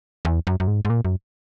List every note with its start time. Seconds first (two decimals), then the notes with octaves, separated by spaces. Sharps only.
0.25 E2
0.47 F#2
0.60 F#2
0.68 G#2
0.85 G#2
0.90 A#2
1.05 F#2